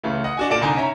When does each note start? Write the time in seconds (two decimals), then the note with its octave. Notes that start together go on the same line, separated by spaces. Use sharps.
0.03 C#2 C#3 E3 A3
0.24 D#5 F#5
0.37 D4 F#4 G#5
0.49 A#2 A#3 A4 D5 D7 E7
0.61 C2 D3 D#4 G#5 A#5
0.76 C#4 E5 A#5